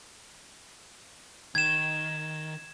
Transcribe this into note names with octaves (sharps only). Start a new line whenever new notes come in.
D#3 G#6 E7